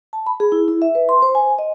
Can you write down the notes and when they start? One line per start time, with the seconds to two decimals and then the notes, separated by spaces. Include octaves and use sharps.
0.13 A5
0.27 B5
0.40 G#4
0.52 E4
0.68 E4
0.82 E5
0.95 B4
1.09 C6
1.22 C5
1.35 G#5
1.59 D#5